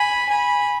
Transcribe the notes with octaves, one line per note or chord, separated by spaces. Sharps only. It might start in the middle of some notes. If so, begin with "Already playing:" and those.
Already playing: G#5 B5
G#5 B5